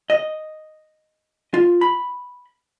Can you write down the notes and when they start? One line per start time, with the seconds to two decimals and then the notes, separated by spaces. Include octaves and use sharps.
0.10 D#5
1.54 F4
1.81 B5